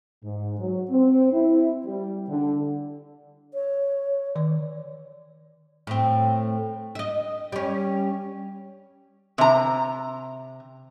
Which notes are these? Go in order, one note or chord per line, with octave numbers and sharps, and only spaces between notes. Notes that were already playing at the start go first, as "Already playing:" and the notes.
G#2
F#3
C4
E4
G3
D3
C#5
D#3 D5
A2 C4
D#5 E5
G3 C#4
C3 A#5